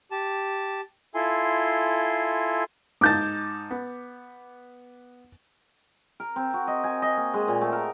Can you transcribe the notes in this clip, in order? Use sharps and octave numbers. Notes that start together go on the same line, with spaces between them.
G4 A5
E4 F4 A4 G#5 C6
G#2 D#4 A5 D6 G6 A6
B3
A#4
C4
F#4
D#5
G#5
D#5
A#3
G#3
A#2
A3
A#4